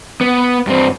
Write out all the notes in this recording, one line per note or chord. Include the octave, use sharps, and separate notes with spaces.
B3
G2 C4